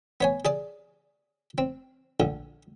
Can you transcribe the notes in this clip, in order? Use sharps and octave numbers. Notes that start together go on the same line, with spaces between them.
B3 C#5 G#5
G#4 D5 D#6
C4
A#1 D3